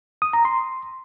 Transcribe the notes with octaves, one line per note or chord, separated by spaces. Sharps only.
D#6
A#5
C6